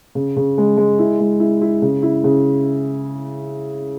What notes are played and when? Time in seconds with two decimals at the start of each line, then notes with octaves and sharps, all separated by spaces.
0.15 C#3
0.36 C#3
0.58 G#3
0.77 G#3
0.99 E4
1.20 G#3
1.40 E4
1.61 E4
1.82 C#3
2.02 E4
2.24 C#3